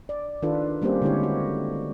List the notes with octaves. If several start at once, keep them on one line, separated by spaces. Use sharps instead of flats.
D5
D#3 D4 F4 A4 B4
G3 A#3 C4 C#4 G4 C5
D3 G#3 D4 E4 G4 C#5
F#4